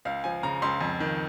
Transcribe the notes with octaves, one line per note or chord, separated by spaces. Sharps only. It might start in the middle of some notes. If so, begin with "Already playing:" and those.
C#2 F5
F3 G#5
C#3 A#5
C#2 C6
F2
D#3